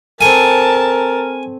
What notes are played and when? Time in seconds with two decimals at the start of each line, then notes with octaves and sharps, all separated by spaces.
0.21 A3 C4 A#4 G#5 A5